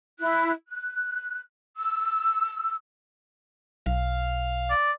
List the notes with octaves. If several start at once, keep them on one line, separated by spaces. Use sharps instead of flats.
E4 F#6
F#6
E6
B1 F5
D5